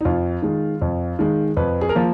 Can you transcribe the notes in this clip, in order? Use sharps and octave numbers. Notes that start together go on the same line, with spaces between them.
D#4
F2 F4
D#3 G#3
F2
D#3 G#3
F2 B4
G#4
A#4
F3 A#3